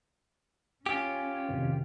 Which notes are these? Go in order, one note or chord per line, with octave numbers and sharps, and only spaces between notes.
C#4 F4 G4 G#5
F2 C3 D#3